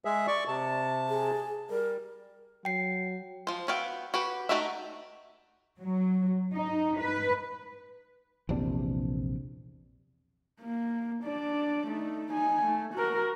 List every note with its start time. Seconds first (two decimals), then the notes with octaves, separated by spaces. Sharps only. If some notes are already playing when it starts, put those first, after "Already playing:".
0.05 G#3 G#4 E5
0.27 D5 C#6
0.48 C3 A5
1.09 G#4
1.70 G3 A#4
2.65 F#3 G5 C7
3.47 F3 C5
3.68 B3 F#4 E5 F5 G5
4.14 F#4 G4 B4
4.49 A3 D#4 F#4 G4 E5
5.80 F#3
6.54 D#4
7.00 B4
8.49 A#1 E2 C3 D4
10.62 A#3
11.24 D4 D5
11.88 A3 D#4
12.32 D#4 G#5
12.65 A3
12.95 F#4 A#4